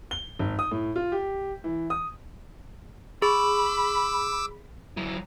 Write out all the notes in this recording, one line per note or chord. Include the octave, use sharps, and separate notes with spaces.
G7
G#1
D#6
A2
F4
G4
E3
D#6
G#4 B5 D6 E6
F#3 E4